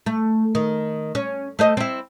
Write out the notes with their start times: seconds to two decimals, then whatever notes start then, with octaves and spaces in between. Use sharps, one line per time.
0.06 A3
0.55 D#3
1.15 C#4
1.59 A3 C5 D#5
1.77 C4 E4